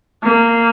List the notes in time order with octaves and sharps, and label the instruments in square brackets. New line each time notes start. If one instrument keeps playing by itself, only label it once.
[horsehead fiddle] A#3